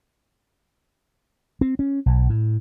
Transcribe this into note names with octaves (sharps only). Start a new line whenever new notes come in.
C4
C#4
B1
A2